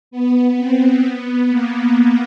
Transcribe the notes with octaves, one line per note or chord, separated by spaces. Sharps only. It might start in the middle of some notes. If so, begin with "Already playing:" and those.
B3
C4
B3
A#3